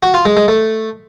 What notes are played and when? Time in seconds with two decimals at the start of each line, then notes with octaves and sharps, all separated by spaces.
0.03 F#4
0.14 F4
0.25 G#3
0.37 G#3
0.48 A3